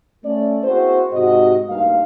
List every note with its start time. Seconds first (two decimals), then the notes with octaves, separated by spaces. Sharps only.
0.25 A3 C#4 D5
0.64 A#3 C4 E4 F#4 G#4 C5
1.13 G#2 C3 F#4 D#5
1.69 D2 G2 A#3 D#4 F5